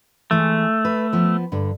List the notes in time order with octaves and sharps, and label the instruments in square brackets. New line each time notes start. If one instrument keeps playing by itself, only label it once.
[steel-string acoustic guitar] E3 G#3 [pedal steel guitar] A3
[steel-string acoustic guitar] B4
F3 B3
G2 D3